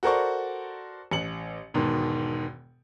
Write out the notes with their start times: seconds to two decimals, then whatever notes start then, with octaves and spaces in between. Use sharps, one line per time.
0.03 F#4 A4 A#4 C5 D5 C#6
1.11 A1 C#7 F#7
1.74 E1 G#2 B2 D#3